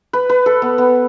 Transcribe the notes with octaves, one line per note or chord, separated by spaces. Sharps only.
B4
B4
A4
B3
B3